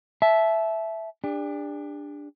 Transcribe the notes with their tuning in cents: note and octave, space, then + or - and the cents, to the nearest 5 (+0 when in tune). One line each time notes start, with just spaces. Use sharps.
E5 +0 A5 -30
D4 +0 G4 +45